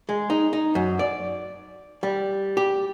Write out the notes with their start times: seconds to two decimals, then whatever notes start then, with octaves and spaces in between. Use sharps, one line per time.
0.09 G#3
0.30 D#4
0.53 D#4
0.75 F#2
0.99 D5
2.03 G3
2.57 G4